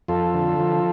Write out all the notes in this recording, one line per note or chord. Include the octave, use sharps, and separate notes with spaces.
F2 F4 A4
D3
F3